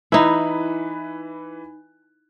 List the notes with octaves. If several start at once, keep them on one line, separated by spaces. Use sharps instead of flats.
E3 D#4 E4 B4 B5